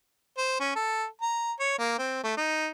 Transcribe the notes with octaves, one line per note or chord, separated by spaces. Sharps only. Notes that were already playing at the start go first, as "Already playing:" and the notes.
C5
C#4
A4
A#5
C#5
A#3
C4
A3
D#4